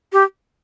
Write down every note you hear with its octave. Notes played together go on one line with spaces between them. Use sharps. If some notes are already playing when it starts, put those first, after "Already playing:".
G4